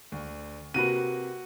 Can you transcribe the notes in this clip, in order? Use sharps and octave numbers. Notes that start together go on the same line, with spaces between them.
D2
C3 A#3 F#4 B4 D#7